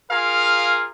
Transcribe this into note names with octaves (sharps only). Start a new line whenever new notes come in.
F4 G#4 A#4 F5